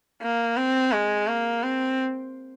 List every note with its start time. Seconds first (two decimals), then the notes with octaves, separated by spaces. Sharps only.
0.22 A#3
0.57 C4
0.92 G#3
1.27 A#3
1.63 C4